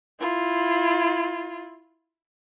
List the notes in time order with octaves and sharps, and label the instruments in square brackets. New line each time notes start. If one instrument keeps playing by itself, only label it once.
[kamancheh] E4 F4